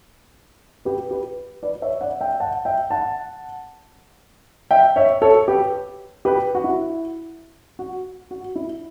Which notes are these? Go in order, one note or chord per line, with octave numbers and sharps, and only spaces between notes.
G4 B4
G4 B4
B4 D5
C#5 E5
D5 F#5
E5 G5
F#5 A5
E5 G5
F#5 A5
E5 G5
C#5 E5
A4 C#5
G4 B4
G4 B4
F#4
E4
F#4
F#4
E4